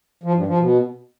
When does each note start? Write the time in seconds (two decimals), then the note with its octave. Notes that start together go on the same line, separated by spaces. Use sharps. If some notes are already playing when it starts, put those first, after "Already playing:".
0.23 F3
0.35 G2
0.47 F3
0.59 B2